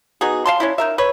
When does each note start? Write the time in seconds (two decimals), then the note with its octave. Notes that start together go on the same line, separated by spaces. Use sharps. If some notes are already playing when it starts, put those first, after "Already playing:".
0.21 B3 D#4 F#4 G#4
0.45 F5 A5 C6
0.60 C#4 D4 E4
0.78 D#4 A#4 E5
0.98 B4 C#5